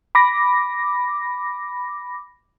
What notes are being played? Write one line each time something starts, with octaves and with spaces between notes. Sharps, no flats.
B5 D6 A#6